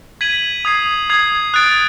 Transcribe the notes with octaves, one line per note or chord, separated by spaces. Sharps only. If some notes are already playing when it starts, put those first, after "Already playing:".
G#6 B6 D#7 F#7
D#6 G#6 C7
D#6 G#6 C7
D#6 F#6 A6 D7